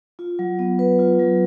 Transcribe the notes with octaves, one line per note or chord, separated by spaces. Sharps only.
F4
F#3
B3
B4
F4
F#3